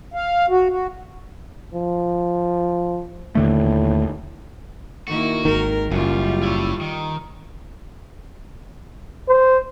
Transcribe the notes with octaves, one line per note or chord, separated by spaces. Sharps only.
F5
F#4
F#4
F3
D#2 A2 D3 A3
D#3 A#3 E4 F#4
G#1 D#3 A#4
F#1 F#2 G3 F4
E4 C#5
D#3
C5